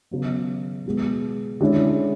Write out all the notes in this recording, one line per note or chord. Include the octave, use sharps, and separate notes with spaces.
C#3 F#3 B3
B2 G#3 B3
D3 G#3 C#4 E4